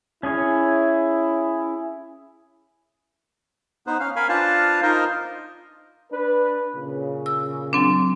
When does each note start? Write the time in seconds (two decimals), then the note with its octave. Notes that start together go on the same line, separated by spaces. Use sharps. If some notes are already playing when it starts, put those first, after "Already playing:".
0.23 C#4 E4 G#4 C#5
3.87 B3 D#4 B4 C5
4.00 C#4 F5
4.16 A#4 F5 G#5 B5
4.29 D4 F4 B4 C5 F5 A5
4.82 D#4 F4 A#4 C5 D#5
6.12 D4 B4
6.74 A#2 C#3
7.26 E6
7.73 F#3 C4 D4